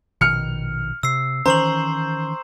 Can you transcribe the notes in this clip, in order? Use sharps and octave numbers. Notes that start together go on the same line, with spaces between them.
A#1 B2 D#3 F6 C#7
C3 E6 C7
D#3 E3 C#4 C5 A#5 C#6 F#7